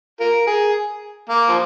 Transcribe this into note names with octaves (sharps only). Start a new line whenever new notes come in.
F4 A#4
G#4
A#3
F3